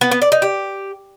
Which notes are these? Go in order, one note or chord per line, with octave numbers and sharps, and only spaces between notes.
B3
B3
D5
D#4
G4